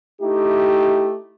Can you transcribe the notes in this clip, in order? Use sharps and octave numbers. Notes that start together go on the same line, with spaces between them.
A3 D#4 E4 G4